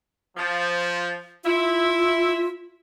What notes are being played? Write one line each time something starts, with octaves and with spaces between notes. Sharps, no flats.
F3
E4 F4 E5